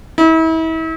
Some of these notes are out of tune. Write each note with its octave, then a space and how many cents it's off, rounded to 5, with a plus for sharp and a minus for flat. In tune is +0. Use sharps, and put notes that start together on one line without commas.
E4 -35